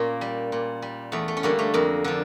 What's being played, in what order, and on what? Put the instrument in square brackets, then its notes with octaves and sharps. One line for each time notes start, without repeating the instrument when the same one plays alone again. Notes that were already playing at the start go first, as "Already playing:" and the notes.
Already playing: [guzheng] A#2 A#3 C#4
G3
A#2
G3
E2 A3
A3
C#4
D3 G3 A#3
A3
F2 A#3
D3 F3